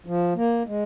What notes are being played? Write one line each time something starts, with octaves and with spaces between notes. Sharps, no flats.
F3
A#3
G#3